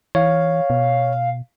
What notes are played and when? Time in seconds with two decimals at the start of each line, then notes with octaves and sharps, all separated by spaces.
0.15 E3 C#5 F5
0.70 B2